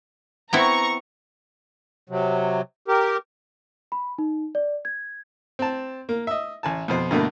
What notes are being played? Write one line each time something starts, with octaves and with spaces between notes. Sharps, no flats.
B3 C4 E4 A#5 C#6
C3 F#3
G4 A#4
B5
D#4
D5
G#6
C4 A5
A#3
D#5 E5
A1 G#5 A5
F2 B2 C5
G2 B2 D3 A3 A#3